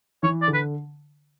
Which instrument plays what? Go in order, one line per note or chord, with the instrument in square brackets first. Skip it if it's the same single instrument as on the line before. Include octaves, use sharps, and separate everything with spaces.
[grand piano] E3 [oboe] C#5
[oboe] D5
[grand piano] D3
[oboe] B4